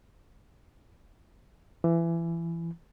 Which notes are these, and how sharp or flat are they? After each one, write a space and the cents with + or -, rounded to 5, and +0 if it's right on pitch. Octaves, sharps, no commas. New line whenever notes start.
E3 +25